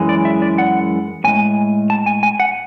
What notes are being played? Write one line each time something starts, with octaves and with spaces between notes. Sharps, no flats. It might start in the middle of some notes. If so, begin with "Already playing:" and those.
Already playing: F#2 E3 G#3
D5
E5
D5
F#5
A2 G#3 G#5
A5
G#5
G#5
F#5